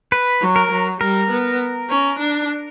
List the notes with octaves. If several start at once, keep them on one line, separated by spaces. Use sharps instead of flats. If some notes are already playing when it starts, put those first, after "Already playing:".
B4
F#3
A#4
F#3
G3 A#4
B3
C#4
D4